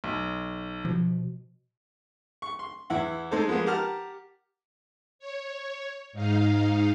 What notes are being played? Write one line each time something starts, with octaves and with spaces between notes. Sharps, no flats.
B1
B2 F3
C#6
C6
E2 E4 F#5
G#3 D#4 A4 C5
F3 G#3 A#3 B3
G4 A#4 F#5 A5 A#5 F6
C#5
G#2 D#4 F5